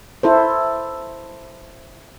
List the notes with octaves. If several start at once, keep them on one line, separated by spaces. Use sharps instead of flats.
E4 A4 C5